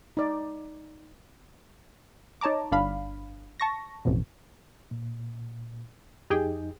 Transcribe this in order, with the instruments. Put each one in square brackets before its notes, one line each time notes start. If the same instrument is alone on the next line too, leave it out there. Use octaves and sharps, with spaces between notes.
[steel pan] D#4 D5
[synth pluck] D#4 C#5 A5 A#5 D6
G1 D4 F5 B5
A5 C#6 A#6
A1 F2 B2
[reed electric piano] A#2
[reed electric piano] F2 D#4 [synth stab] G4 G#4 G5